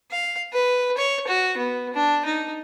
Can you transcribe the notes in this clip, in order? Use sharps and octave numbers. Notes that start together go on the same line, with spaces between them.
F5
B4
C#5
F#4
B3
D4
D#4